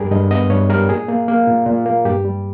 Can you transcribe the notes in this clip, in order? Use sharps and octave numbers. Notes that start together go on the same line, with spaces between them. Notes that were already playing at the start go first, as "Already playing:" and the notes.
Already playing: G2 G3 G4 G#4 A#4
G2 D#5
B3 D#5
G2 C#5
G3 A#4
A#2 G#4
A#3
A#3
A#2
A#2
A#3
G2 G4
G3